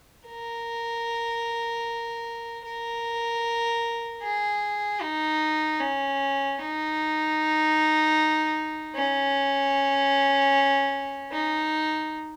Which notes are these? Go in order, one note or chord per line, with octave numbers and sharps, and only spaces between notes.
A#4
A#4
G#4
D#4
C#4
D#4
C#4
D#4